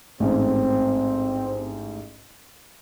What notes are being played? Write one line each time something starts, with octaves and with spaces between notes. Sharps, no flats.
A1 G#2 C4